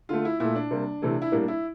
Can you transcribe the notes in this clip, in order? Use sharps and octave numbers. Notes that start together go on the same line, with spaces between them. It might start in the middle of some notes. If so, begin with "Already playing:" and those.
D3 A3 F4
E4
A#2 A3 E4
D4
C3 G3 A#3
C3 E3 A3
E4
A2 G3 A#3 D4
E4